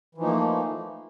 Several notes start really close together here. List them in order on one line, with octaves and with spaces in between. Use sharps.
E3 F3 D#4 A#3 A3